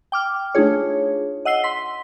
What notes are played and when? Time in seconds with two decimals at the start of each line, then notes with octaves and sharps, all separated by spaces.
0.12 G5 D6 F6
0.55 A3 D4 D#4 F4 G#4 C#5
1.45 D#5 F#5 E6 C7 G7
1.64 C6 B6